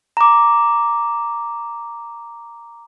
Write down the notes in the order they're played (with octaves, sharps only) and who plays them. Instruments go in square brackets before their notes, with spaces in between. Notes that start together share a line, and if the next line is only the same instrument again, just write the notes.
[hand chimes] A#5 D6